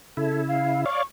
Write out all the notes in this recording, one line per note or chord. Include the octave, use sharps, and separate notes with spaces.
C#3 E4 A4
F5
C#5 D5 F5 C#6